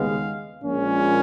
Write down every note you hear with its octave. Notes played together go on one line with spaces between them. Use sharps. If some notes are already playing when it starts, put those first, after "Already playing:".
Already playing: D#2 C#3 G#3 B3 F5
A#1 A#2 G#3 C#4